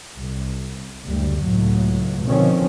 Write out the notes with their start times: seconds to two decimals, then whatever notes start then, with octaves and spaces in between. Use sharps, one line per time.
0.18 C2
1.06 F#1 D2 G3
1.46 C#2 A2 F#3
2.24 B2 D3 D#3 F3 C4 C#4